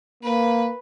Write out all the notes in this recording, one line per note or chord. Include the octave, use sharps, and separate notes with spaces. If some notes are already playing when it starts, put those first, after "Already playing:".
A#3 B4